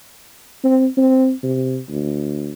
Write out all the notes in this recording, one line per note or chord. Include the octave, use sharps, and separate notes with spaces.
C4
C4
C3
D2